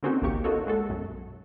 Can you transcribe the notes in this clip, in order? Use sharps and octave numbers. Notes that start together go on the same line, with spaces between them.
D3 A#3 C4 C#4 D#4 F#4
G#1 C#2 A#3 G4 C#6
A#3 D#4 F4 F#4 A4 C#5
G#3 F#4 A4
B1 F#2 F#3